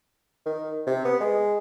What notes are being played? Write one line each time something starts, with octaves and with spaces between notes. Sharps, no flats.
D#3
C3
B3
G#3